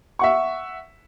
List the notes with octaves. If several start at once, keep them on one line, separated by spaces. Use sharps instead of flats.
E5 F#5 C#6